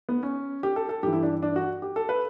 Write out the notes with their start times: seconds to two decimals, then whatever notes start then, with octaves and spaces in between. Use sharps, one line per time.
0.09 B3
0.23 C#4
0.63 G4
0.76 A4
0.89 A4
1.03 G2 E3 G4
1.13 E4
1.23 D4
1.42 D4
1.56 F#4
1.82 G4
1.96 A4
2.09 B4